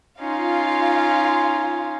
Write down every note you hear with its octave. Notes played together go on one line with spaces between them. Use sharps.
C#4 D#4 F4 F5